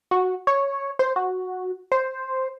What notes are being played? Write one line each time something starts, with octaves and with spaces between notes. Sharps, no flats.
F#4
C#5
C5
F#4
C5